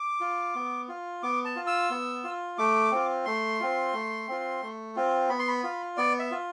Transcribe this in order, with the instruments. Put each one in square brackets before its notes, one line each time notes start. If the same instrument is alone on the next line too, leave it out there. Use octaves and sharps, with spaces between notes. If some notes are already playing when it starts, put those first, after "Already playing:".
Already playing: [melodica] D6
F4
B3
F4
B3 D6
A5
F4
E6
B3
F4
A3 D6
C4 F4
A3 C6
C4 F4
A3
C4 F4
A3
C4 F4
B3 B5
C6
B5
F4
B3 D5
E5
F4